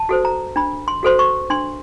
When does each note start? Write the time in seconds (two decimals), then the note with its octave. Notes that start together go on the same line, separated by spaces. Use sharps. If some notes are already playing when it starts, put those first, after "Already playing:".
Already playing: A5
0.09 F#4 A4 C5
0.25 A#5
0.56 D4 B5
0.88 C6
1.03 F#4 A4 C5 C6
1.19 C#6
1.50 D4 C6